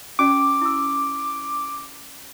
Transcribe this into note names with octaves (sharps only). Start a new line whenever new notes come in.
C#4 F#4 D5 D6
E4 E6